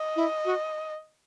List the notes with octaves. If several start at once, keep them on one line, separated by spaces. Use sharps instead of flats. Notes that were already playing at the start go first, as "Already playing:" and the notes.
Already playing: D#5
E4
F#4